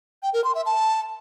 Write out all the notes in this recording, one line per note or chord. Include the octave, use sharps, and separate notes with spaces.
G5
A#4
C6
E5
A5